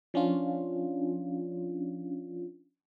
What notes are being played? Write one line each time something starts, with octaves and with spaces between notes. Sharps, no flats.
F3 C#4 D4 F4